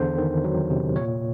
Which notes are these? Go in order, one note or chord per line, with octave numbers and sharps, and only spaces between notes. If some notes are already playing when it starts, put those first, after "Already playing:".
Already playing: E2 D3 C5
D#3
F#3
C3
A#2 C#5